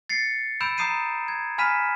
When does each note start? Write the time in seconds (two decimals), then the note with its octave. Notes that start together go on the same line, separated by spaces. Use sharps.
0.09 A6 C7 C#7
0.61 B5 E6 G6 D7 E7
0.77 A#5 D#6 G6 C7 D#7 E7
1.28 G#6
1.58 G#5 B5 F6 B6 D#7 E7